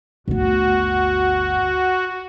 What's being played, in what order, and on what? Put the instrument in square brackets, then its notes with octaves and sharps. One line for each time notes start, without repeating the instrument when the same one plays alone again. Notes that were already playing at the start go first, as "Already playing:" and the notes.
[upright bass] G1 D2 [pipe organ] F#4